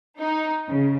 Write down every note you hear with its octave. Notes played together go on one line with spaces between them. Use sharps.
D#4
C#3